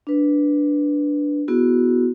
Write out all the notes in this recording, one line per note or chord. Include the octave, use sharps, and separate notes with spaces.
D4 B4
B3 E4 F#4 G#4